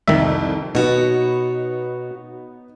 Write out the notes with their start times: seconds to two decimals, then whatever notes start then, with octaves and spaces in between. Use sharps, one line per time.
0.08 C2 F2 D#3 E5
0.75 B2 B3 D#4 F#4 C#5